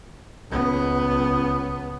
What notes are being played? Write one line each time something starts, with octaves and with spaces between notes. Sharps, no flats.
C#2 B3